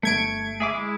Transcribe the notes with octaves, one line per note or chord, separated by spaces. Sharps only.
G1 A3 G#6 D7
G#4 E5 D6
G#3 E4